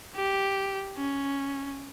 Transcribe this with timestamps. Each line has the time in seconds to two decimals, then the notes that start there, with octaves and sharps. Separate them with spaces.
0.16 G4
0.97 C#4